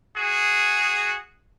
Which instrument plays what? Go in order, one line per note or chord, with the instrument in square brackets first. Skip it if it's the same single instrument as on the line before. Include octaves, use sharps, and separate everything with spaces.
[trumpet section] F#4 G#4